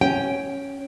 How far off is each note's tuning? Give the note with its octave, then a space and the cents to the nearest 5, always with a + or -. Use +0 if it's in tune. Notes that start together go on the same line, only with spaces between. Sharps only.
C#4 +0 G5 +0